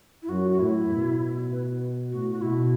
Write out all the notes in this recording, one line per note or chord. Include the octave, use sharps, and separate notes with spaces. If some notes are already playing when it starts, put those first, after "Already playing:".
E4
F#2 F#4
F#4
A2 E4
B2
B4
A2 F#4
F#4
B2 E4